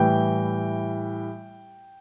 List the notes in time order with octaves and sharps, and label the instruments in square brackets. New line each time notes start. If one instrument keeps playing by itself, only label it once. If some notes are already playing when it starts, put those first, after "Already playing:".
Already playing: [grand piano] A2 E3 G3 G5